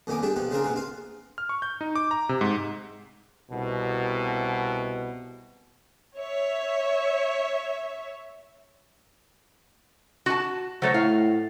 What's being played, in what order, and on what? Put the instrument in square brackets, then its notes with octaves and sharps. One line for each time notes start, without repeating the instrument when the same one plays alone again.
[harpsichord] F2 A#2 D#3 B3 G#5 D6
G3 D4 G#4 E5 G5
B2 F3 G4
C#3 C4 D4 F4 G#4 A#4
A#1 B2 B3 C4 G#4
F4 F5
[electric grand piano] F6
C#6
G6
D#4
D6
A#5
C3
G#2
[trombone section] C2 B2
[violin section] C#5 E5
[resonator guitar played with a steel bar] F#4 A5
[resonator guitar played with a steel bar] F#3 A3 C#5 [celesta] C5 A6 A#6
[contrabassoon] A2 [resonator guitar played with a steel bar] F5 [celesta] F#5 A6